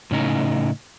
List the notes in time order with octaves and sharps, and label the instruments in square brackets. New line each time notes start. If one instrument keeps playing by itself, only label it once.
[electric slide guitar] A2 C#3 C#4 D#4